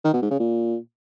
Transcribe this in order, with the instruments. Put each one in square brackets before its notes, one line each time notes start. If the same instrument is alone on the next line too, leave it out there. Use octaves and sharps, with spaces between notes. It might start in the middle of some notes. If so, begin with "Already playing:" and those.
[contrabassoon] D#3
B2
G#2
C#3
A#2